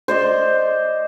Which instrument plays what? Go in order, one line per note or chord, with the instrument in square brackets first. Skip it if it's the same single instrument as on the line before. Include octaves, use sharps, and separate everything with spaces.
[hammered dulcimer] C5 D5 D#5